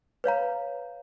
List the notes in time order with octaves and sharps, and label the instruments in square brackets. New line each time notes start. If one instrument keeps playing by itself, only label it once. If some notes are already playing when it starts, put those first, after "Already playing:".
[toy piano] B4 C#5 F5 A#5